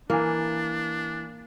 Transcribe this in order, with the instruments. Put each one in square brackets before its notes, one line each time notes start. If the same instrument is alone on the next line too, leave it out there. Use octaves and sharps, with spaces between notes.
[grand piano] E3 G#5 [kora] A#3 [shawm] D4